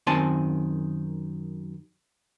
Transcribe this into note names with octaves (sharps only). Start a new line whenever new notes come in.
F#2 D#3 C4 G#5 A5 C6